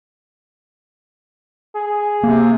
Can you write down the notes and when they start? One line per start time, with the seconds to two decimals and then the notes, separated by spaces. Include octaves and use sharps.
1.75 G#4
2.24 C3 A#3